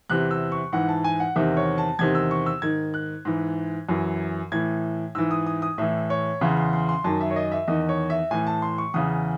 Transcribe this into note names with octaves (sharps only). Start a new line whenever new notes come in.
E2 C3 E3 F#6
E6
C#6
G#2 E3 F#5
A5
G#5
F#5
E2 C3 D#3 E5
C#5
A5
E2 C3 D#3 G#6
E6
C#6
E6
G#2 D#3 G#6
F#6
G#2 E3
F#2 E3
A2 E3 G#6
G#2 E3 E6
D#6
D#6
D#6
A2 E3 E5
C#5
E2 C#3 E3 C6
C6
C6
C6
F#2 D#3 A5
E5
C#5
D#5
E5
E2 D#3 D#5
C#5
E5
A2 E3 G#5
A5
C6
C#6
E2 C#3 E3 D#6